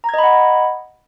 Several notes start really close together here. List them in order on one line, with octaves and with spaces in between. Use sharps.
A#5 G#6 D#5 B5 F#5